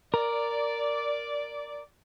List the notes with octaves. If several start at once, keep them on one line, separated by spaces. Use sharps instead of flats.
A#4 D5